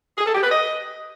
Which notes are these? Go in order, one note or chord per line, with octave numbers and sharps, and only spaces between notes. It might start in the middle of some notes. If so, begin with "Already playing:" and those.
G#4
A4
G4
B4
D#5